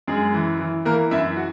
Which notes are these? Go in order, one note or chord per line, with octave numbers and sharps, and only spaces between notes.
F#2 G#3 G#4
E3
E3
E3 A#3 A#4
F#2 E4 E5
F#4